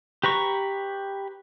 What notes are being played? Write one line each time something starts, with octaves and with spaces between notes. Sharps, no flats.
G4 B4 A#5 C#6